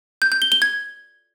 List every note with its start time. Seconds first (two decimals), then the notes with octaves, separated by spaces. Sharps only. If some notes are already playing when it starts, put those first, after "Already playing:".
0.22 G6
0.32 G6
0.42 G7
0.52 G7
0.62 G#6